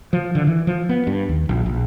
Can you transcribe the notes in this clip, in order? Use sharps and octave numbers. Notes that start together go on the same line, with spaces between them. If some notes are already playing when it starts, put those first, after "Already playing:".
F3
D3
E3
F3
B3
G2
D#2
A#1
A#1